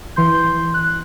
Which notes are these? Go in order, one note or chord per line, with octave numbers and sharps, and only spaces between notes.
E3 C6 G6
F#6